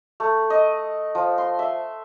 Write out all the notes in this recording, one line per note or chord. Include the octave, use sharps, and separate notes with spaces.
A3
D#5
F3
C6
E5